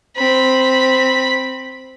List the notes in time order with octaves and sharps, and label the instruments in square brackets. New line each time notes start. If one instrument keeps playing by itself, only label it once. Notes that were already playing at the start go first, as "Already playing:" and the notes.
[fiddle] C4 B5